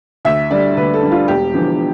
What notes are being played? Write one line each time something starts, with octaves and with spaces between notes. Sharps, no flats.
D2 E5
D3 G3 D5
D2 B4
A4
D3 G3
F4
E1 G4
E2 D3 F3